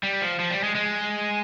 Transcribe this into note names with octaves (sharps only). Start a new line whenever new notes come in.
G3
F3
F3
G3
G#3
G#3